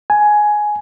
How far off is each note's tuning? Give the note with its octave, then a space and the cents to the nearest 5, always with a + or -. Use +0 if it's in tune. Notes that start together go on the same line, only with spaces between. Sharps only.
G#5 +10